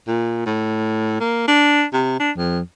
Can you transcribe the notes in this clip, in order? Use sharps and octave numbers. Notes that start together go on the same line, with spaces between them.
A#2
A2
A#3
D4
C3
D4
F2